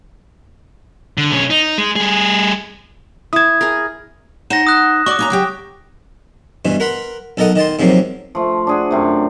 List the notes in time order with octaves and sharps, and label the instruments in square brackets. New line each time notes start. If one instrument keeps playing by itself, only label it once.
[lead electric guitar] D3
B1 C#4
D#4
G#3
G3 G#4
[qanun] E4 A5 [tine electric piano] D#6 G#6
[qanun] G#4 A#4
[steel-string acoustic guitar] D#4 C5 F#5 [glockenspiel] A#6 E7
[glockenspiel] D#6 F#6
[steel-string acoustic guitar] F#4 D5 [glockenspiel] C#6 D6
[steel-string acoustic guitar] A#3 C#4 A#5
C#3 F#3 G4
[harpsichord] G2 B2 E3
A#4 B4 F#5 B5 C6
B1 A4 A#4 D#5 F#5 D#6
D#3 D#5 A5 C6
G#2 C3 F3 F#3 A#3
[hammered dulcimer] F3 A3
D4 G#4 F#5
F#2 C3 A3